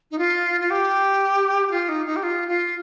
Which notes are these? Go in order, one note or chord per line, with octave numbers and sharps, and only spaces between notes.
D#4
F4
F4
G4
G4
F4
D#4
D#4
G4
F4
F4